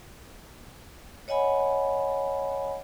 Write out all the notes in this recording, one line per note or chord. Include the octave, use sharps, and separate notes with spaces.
C#5 D#5 F#5 G#5 B5